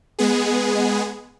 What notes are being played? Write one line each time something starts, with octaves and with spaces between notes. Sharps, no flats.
G#3 B3 G#4